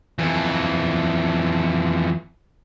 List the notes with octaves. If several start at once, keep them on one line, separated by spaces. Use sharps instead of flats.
F2 E3